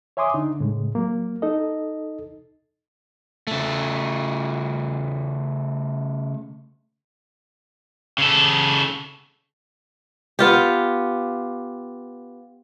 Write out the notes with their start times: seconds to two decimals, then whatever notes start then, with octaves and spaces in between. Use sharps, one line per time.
0.17 C#5 E5 G#5 C6 D6 D#6
0.34 D3 D4 D#4
0.60 A2 C#3 G#3
0.95 F#3 A#3
1.42 D#4 A4 D#5
3.47 C#3 A3
8.18 C#3 A4
10.39 B3 F4 G4